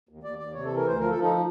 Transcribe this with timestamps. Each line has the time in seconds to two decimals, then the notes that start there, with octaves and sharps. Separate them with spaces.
0.09 D#2
0.23 D#2 D5
0.38 D#2 D5
0.54 C3 C#5
0.65 E3 A4
0.76 A#4
0.84 D2 C5
0.99 F3 A#4
1.10 F3 A4
1.22 D#4